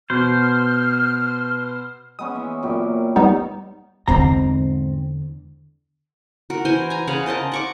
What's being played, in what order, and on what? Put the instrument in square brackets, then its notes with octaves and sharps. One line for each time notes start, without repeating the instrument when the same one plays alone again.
[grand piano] B2 B3 [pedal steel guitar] C5 [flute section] F6
[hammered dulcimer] G#3 B3 C#4 [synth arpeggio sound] D#6
[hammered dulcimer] E3 E5
F#2 A#2 G4
[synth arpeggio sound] G3 B3 D#4
[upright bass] E2 D3 [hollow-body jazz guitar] G#2 C4 A#5
[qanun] F#4 A#4
E3 C5 G#5 C6
G#5 A#5
C#3 G#4 F5 F#5
A#4 C5 D#5 A5
F#5 C#6 D6